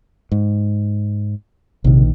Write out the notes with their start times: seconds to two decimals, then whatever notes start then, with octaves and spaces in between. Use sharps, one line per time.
0.32 G#2
1.84 A#1 C3 D#3